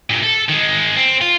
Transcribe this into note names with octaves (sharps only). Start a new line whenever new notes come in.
G2 A#2
A4
D#3 G#3
C4
F4